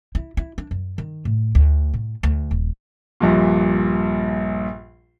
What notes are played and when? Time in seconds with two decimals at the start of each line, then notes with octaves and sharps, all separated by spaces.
0.15 E4
0.37 E4
0.58 D4
0.71 F#2
0.98 D#3
1.25 A2
1.55 D2
1.94 A2
2.23 D2
2.51 D#1
3.20 A#1 G2 A#2